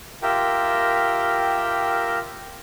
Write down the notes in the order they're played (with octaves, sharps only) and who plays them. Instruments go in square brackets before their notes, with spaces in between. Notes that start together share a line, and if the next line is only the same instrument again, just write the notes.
[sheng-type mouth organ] F4 G4 A#4 E5 G5